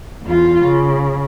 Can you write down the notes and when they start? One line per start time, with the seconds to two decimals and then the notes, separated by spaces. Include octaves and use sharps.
0.23 E2 F4
0.63 C#3